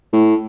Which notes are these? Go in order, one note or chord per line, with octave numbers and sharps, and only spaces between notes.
A2